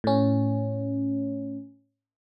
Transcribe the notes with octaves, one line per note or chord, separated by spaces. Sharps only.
A2 C#4